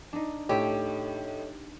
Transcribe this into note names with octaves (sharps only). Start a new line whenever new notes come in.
D4 D#4
A2 G4 A4 C#5 D#5